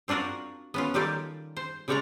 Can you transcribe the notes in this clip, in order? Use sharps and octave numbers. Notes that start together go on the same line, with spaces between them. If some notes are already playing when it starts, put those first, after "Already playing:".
C4 D4 F4 F#4 A#4
B3 C#4 F4
D#3 G3 F4 G4 A4 A#4
C5
C#3 G3 G#3 C#5 D5 A#5